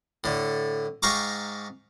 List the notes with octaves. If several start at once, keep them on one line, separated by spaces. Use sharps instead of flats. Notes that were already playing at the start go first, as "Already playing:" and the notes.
A2 D3
G#2 F5 G5 A#5 C#6 D6